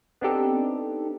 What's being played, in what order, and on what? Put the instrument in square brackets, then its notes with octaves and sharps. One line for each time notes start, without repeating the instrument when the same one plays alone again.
[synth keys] B3 C4 D4 D#4 G4 A4